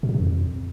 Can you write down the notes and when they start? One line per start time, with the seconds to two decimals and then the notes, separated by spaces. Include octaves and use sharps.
0.03 B2
0.09 A#2
0.14 C3
0.20 F2